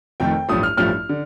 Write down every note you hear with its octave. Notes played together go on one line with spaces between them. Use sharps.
F1 F2 D#3 A3 G5
A1 G2 F3 A3 D#6
F6
A1 G2 F3 A3 F6
D3